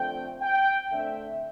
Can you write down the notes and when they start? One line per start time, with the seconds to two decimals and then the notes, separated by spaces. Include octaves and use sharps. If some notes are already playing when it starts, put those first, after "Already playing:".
Already playing: D3 F3 A3 C4 G5
0.41 G5
0.91 D3 A3 C4 E5